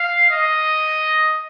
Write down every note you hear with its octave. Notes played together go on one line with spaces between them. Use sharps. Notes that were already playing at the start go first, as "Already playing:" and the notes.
Already playing: F5
D#5